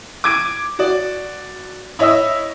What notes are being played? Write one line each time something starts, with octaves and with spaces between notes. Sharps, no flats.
D6 G#6 D7
F#4 D5
E4 C#5 D#5 E5 E6